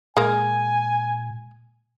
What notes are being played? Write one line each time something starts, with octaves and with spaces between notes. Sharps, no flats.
A#2 G#3 A#3 G#5